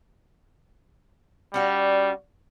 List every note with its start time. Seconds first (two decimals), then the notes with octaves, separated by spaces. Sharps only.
1.54 G3 C#4 F#4 D5